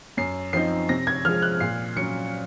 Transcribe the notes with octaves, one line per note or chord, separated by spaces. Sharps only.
F#2 C7
F3 C4 D#4 C7
C3 A#6
G#6
F3 G#3 F6
F#6
A#2 C7
F#3 C#4 C#7